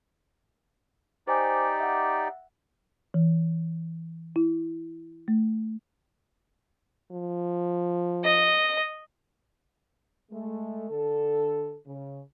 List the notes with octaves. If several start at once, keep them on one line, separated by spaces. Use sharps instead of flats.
D#4 G4 C5 D5 G#5 D6
E5 F#5
E3
E4
A3
F3
D#5
G#3 A3
D3 A4
C#3